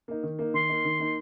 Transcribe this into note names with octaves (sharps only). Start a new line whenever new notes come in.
A#3 D#4
D#3
A#3 D#4
D#3 C6
A#3 D#4
D#3
A#3 D#4